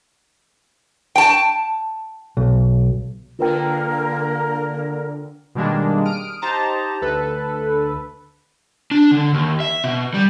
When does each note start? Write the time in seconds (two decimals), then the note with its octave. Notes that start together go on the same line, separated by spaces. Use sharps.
1.16 G5 A5
2.37 B1
3.39 D3 A#3 F4 A#4 B4 G5
5.55 B2 D#3 G3 G#3 A#3 D4
6.05 D#6 F6 D7
6.42 D#4 G4 C5 A5 A#5
7.02 D2 A4 B4
8.91 D4
9.11 D3
9.34 D#2
9.60 E5
9.84 B2
10.14 G3